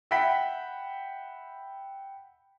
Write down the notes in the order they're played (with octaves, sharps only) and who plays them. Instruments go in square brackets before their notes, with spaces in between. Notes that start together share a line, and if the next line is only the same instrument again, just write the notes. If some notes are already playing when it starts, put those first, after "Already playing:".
[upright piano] E5 F#5 G5 B5 B6